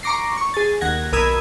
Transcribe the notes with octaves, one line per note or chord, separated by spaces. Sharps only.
A#5 C#6 D6 A#6 C7
C#6
G#4 A6
D#2 F#5 G#6 A#6
B1 A#4 B5 D#6 E6 G#6